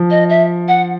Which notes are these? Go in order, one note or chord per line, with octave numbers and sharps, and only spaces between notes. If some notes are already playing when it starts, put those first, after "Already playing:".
Already playing: F3
D#5
E5
F#5